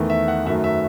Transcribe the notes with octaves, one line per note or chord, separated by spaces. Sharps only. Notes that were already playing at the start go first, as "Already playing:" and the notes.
Already playing: E2 D#3 A3
E5
F#5
F#2 D#3 F#3 A3 E5
E5